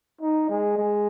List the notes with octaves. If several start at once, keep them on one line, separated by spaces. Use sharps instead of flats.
D#4
G#3
G#3